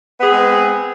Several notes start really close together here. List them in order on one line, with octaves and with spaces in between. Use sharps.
B3 G#4 C4 G#3